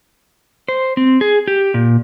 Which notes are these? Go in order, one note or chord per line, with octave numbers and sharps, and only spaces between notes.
C5
C4
G#4
G4
A#2